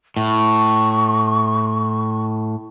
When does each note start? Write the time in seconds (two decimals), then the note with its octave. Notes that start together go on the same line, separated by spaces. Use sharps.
0.17 A2 C#6